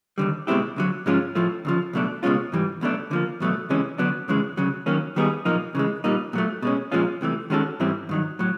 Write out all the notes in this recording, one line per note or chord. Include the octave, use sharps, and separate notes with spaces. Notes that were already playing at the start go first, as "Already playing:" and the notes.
D#2 D3 G3
B2 G#3 C4 E4 G4
D2 D3 F#3
G#2 F3 G#3 C#4 F4
A2 F3 A3
D2 C#3 F3
C#2 B2 F#3 A3 D4
C#2 B2 G#3 C#4 F4
G#2 E3 G3
B1 B2 F#3 A3 D4
D3 F3 A#3
E2 B2 F#3 A3
C#2 C3 E3 G#3 C#4
D3 F#3 B3 D4
F#2 C#3 E3 G#3
D2 C#3 F#3
D#3 F#3 A#3 C#4
D#3 G3 B3 D#4 G#4
B1 A#2 F3 A#3 D#4
C#3 E3 G#3
A#2 G3 A#3 D#4
A#2 F#3 A3
B2 G#3 C#4
A#2 F3 G#3 C#4 F4
C2 C3 E3 A3
D#3 G#3 C#4 F#4 A4
G#2 E3 G3 C4 E4
G2 D#3 F#3
A2 F#3